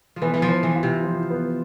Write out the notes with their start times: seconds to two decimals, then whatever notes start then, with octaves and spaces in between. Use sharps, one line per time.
0.16 F3
0.22 E3 B3
0.34 E3
0.42 F3
0.49 C5
0.63 E3
0.76 F4
0.83 C3
1.03 F3
1.30 B3